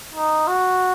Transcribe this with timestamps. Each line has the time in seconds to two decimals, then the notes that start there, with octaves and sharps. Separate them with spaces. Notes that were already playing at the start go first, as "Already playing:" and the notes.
0.14 D#4
0.48 F#4